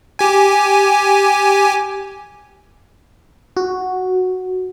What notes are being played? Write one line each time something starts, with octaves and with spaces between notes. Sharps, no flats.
G4 G#5
F#4